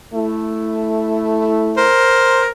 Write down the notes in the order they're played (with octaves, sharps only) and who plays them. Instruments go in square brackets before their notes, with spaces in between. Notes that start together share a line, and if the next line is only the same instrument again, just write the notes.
[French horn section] A3 E4
[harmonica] A#4 C5